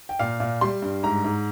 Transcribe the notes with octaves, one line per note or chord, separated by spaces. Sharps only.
G5
A#2 F5
A#2
G3 C6
G2
G#2 A#5
G#2